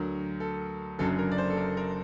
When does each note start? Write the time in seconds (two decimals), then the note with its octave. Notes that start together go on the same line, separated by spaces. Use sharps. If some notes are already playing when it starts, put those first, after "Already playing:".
Already playing: D2 D3 F#3 A#4
0.40 A4
0.98 F#1 F#2 D3 F#3 A4
1.19 A#4
1.32 D5
1.38 C5
1.50 A4
1.57 A#4
1.77 A#4